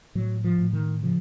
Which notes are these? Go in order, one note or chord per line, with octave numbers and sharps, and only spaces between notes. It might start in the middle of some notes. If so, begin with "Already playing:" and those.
A2 F#3
F3
A2
D#3
C#3 F3